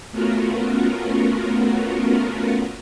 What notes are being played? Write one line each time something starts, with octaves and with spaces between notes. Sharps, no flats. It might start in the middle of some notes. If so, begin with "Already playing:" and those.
A3 B3 C#4 F4 F#4 A#4